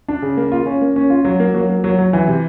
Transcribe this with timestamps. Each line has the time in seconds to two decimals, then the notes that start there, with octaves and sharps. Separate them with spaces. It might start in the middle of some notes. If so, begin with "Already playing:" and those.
0.08 D4
0.22 C#3
0.37 A#3
0.52 F4
0.66 C#4
0.82 A#3
0.96 C#4
1.10 F4
1.25 F#3
1.40 A#3
1.54 F#3
1.69 A#3
1.84 F#3
1.98 F#3
2.13 E3
2.28 C3